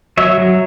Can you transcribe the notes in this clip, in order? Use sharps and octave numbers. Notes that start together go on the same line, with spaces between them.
F#3 C#5 E5
F#3